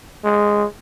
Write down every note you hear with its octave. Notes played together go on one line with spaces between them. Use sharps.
G#3